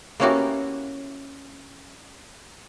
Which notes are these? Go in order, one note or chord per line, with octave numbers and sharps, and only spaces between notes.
A#3 B3 C#4 E4 F#4 G4